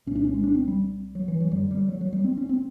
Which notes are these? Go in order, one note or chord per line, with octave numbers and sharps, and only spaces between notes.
C2 A#2 C#4
D4
C#4
G#3
D4
C4
G3
F#3
E3
F#3
F#2 D3 G3
G3
F#3
F#3
G3
C4
C#4
C4